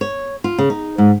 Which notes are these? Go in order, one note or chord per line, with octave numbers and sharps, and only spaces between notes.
C#5
F4
C#3
D#4
G#2